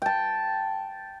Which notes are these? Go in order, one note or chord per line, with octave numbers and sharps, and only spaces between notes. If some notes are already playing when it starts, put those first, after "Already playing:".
G5 A5